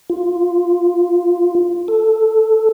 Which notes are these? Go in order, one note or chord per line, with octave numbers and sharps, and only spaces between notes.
F4
A4